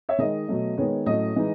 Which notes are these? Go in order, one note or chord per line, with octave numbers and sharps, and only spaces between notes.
C#5 E5
D#3 G#3 D#4 D#5
B2 F#3 A3
D#3 G#3 B3 C#5
A2 F#3 A3 C#4 D#5
E3 G#3 D#4